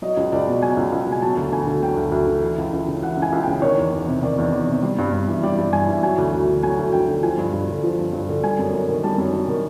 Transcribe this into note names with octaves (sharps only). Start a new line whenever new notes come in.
F#3 D#5
C#2
C#2 D5
B2
F#3 G#5
C#2
C#2
B2
G#5
F#3 A5
D2
D2 G#5
D3
F#3 G5
D2
D2
D3
E3
C#2
C#2
C#3
E3 F#5
C#2
G#5
C#2
C#3 G5
D#3 C#5
E2
E2
C3
D#3 D5
E2
E2
C3
G3
G2
G2
E3
G3 D5
G2
G2 G#5
E3
F#3 G#5
D2
D2
D3
F#3 G#5
D2
D2 G5
D3
F3 G#5
G2
G2
D3
F3
G2
G2
D3
G3 G#5
F#2
F#2
D#3
G3 A5
F#2
F#2
D#3